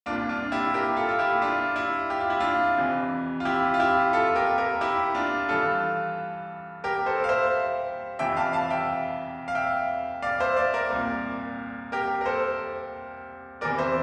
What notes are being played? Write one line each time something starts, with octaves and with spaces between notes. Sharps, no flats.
C2 A#2 D4 F4
D4 F4
E4 G4
G4 A#4
F4 A4
F4
E4 G4
D4 F4
E4
G4
F4
E4
D4 F4
F2 C3 E3
F4
E4 G4
F4
E4 G4
F4 A4
G4 A#4
G4 A#4
E4 G4
D4 F4
G2 E3 F4 A4
G4 A#4
A4 C5
F5
C5 E5
F2 C3 E3 E5 G5
F5 A5
F5 A5
E5 G5
F5
E5 G5
D5 F5
C5 E5
D5 F5
A#4 D5
C2 A#2
G4 A#4
A#4
A4 C5
E2 C3 E3 A#4 D5
C5 E5